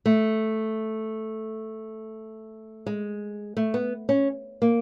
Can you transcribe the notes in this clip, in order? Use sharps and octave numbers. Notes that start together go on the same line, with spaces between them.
A3
G#3
A3
B3
C#4
A#3